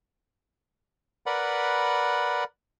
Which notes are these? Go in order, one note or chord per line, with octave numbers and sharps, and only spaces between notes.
A#4 B4 D5 F#5 B5